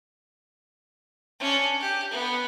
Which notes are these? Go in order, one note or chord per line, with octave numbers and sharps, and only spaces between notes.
C#4 D4
G4
B3